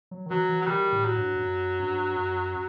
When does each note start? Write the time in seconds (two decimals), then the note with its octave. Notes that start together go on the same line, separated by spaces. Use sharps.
0.11 F#3
0.26 D#3
0.30 E3 F#3
0.49 E3
0.62 F#3
0.67 D#3 G3
0.92 A2
1.05 F#3
1.17 G2
1.36 G2
1.42 F#2
1.79 G2
2.16 F#2